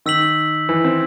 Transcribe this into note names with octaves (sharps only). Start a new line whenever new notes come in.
D#3 E6 B6 F#7
E3
C4